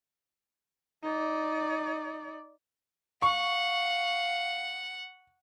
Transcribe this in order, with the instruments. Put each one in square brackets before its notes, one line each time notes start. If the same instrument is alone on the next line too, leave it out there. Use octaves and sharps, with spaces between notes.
[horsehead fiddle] D#4 D5
[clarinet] F5 [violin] F#5 [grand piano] C#6